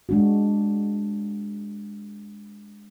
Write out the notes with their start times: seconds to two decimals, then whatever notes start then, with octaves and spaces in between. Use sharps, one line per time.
0.09 G#3 D4 F#4